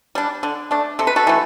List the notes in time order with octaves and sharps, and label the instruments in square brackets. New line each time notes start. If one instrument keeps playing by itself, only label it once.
[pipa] G3 D4
D3
A3 D4
C3 A4
B4
F#4 A4
E3 A3